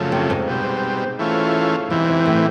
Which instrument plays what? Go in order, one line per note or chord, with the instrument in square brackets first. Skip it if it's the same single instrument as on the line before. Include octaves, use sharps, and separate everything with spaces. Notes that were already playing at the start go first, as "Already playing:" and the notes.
Already playing: [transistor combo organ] F#2 C#3 F3 A3
[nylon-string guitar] C3
G#2
[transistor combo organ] B2 G3 C4
E3 A3 C#4 F4
[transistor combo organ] E2 C3 E3 [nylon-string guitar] G#2
[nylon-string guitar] G#2
A2